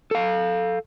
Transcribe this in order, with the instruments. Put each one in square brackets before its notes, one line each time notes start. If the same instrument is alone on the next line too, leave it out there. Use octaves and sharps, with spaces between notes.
[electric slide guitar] A4 F5